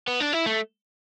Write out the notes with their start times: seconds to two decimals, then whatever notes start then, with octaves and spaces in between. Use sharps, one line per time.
0.08 B3
0.20 D4
0.33 E4
0.46 A3